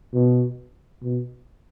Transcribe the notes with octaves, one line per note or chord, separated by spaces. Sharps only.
B2
B2